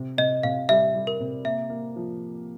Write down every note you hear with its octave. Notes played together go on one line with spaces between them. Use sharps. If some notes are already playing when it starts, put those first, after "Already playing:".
Already playing: C3
C3 D#5
C3 F5
G3 E5
G3
A#4
C3
A#3 E5
A#3
F3